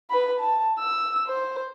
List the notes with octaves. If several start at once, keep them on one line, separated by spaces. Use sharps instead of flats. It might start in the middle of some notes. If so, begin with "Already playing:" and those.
B4 B5
A5
E6
C5